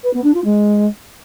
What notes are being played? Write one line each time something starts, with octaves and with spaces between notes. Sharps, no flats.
B4
B3
D4
F4
G#3